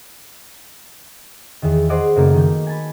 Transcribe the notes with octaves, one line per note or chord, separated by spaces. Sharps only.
E2 D#3
G#4 C5 D5 D#5 F#5
F#2 C#3 A3 A#3
D#3 G6
G#5 A5 B5